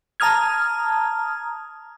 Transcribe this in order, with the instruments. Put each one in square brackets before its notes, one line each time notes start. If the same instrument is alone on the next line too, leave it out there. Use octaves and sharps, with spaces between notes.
[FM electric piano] A5 A#5 D#6 F6 G#6